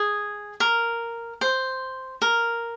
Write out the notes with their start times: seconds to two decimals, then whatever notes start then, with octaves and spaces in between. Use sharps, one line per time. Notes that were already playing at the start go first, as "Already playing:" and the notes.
Already playing: G#4
0.60 A#4
1.41 C5
2.22 A#4